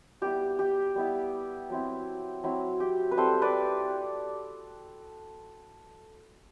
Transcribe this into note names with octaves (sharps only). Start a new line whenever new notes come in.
G3 B3 E4 G4
G4
G3 B3 E4
F#3 C4 E4
F#3 C4 E4
G4
B4
G3 C4 E4 A4 C5
B4 D5